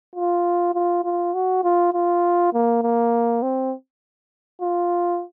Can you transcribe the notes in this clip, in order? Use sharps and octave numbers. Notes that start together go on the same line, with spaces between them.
F4
F4
F4
F#4
F4
F4
A#3
A#3
C4
F4